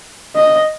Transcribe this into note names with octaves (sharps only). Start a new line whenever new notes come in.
D#5